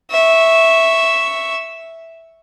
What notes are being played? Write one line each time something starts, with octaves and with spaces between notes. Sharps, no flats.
E5 C#6